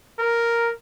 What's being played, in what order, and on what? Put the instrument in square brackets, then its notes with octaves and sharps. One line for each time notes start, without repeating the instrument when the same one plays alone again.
[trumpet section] A#4